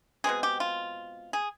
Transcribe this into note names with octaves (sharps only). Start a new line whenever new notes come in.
B2 G#3 C4 D#4 G#4
G4
F4
G#4